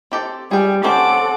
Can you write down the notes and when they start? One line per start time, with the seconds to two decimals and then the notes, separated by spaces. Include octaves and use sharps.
0.12 C4 G4 A4
0.51 G3 G#4 G5
0.84 C4 C#4 A4 C5 F#5 D6